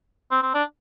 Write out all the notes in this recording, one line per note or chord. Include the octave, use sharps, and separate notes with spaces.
C4
C4
D4